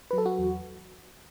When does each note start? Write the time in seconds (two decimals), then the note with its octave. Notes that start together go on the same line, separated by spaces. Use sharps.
0.11 F#3 B4
0.18 A4
0.26 F#4
0.38 E2